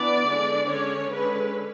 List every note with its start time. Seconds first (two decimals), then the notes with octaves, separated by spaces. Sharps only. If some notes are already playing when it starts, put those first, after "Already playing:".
Already playing: E3 B3 D4 D5
0.26 D3 G#3 D4
0.69 D3 G#3 C#4 C#5
1.11 D3 G#3 C#4 B4